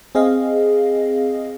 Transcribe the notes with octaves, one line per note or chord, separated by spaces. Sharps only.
C4 G#4 D#5 F5